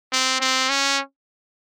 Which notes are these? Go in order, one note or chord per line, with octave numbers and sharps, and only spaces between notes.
C4
C4
C#4